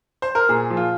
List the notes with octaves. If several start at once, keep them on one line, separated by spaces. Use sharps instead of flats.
C5
A#4
A#2 G#4
F3
F4